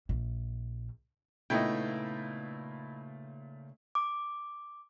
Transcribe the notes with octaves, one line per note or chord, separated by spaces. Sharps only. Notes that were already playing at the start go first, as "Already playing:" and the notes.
A#1
A#2 C#3 A3 B3 D#4 E4 D#5 G5
D6